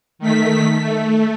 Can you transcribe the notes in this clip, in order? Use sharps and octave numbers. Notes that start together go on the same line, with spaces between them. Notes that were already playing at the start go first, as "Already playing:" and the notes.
D#3 A3 B6
A3